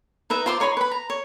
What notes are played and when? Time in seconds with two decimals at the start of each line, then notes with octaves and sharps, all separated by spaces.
0.30 D#4 B4 E5 A#5
0.46 F4 C5 C6 D6
0.60 D#4 C#5 B5 C6
0.77 B4 B5
0.91 A#5
1.10 C#5